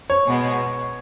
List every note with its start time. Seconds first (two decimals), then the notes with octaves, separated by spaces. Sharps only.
0.10 C#5
0.26 B2 G#3 B3